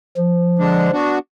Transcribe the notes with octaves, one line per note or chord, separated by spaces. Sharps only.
F3
D3 G#3 D4
B3 D4 F#4